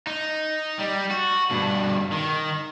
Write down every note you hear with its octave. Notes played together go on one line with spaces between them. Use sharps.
D#4
G3
F#4
G2 B2
D#3